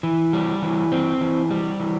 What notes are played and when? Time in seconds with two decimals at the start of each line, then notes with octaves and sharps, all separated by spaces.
0.03 E3
0.33 G3
0.62 E3
0.92 C4
1.21 E3
1.51 G3
1.80 E3